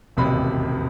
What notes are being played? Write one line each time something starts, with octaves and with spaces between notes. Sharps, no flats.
E1 A1 D#2 C3 B5